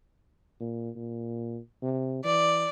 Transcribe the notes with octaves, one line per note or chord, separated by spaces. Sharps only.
A#2
A#2
C3
E3 D5